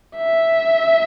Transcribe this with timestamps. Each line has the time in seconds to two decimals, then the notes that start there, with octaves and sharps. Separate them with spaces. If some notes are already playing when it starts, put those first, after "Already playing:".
0.16 E5